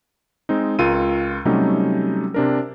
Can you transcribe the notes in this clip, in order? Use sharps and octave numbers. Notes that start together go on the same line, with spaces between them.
G#3 C4 D#4
C#2 F4 A#4 E6 D#7
C3 F#3 G3 A3 C#4 D#4
C3 D4 A#4